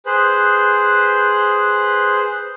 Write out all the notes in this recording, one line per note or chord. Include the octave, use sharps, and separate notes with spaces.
G#4 B4 C5 F#6